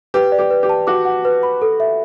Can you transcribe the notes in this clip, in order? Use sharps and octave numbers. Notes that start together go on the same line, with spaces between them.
G4 B4
D5
G4
B4
G4
A5
F#4 D6
F#5
B4
B5
A4
E5